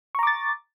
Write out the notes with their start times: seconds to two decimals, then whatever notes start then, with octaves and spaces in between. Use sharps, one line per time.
0.15 C#6
0.19 A#5
0.23 D6
0.27 A6